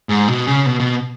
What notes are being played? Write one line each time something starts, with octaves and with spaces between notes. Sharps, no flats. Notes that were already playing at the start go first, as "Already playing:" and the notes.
G#2
B2
C#3
B2
B2